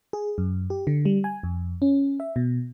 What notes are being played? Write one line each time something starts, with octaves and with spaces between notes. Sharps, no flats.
G#4
F#2
G4
D3
G3
G#5
F2
C#4
E5
B2